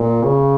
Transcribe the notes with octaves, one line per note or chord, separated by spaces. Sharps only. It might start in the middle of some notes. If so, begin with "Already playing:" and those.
Already playing: A#2
C#3